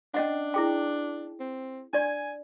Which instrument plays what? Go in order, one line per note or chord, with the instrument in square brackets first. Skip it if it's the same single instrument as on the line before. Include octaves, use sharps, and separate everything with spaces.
[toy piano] C#4 D#5 F#5 [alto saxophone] D4
[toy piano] E4 G#4 G5
[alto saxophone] C4
[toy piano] D4 D5 [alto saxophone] G#5